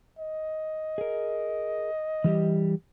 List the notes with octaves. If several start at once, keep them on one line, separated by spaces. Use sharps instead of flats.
D#5
G#4 A#4
E3 G3 G4